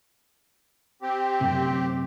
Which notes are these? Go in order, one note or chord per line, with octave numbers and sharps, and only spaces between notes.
C4 G4
F#2 C3